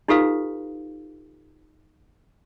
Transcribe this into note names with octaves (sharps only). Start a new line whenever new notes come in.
D#4 F4 G4 A4 B4 F5